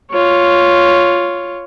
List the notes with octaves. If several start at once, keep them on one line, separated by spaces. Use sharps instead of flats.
F4 C#5